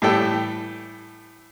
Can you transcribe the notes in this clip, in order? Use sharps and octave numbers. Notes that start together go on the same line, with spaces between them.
A2 E3 G3 A4 G5